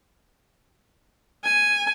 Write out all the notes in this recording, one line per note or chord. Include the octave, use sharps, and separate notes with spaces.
G#5